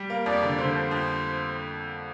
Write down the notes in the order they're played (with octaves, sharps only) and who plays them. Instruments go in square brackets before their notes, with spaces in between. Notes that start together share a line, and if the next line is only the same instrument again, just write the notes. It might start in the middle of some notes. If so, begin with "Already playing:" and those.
Already playing: [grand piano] G3
A#3
[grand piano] F2 [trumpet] D5
[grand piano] D3
[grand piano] D3 [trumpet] C5
[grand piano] F2
F2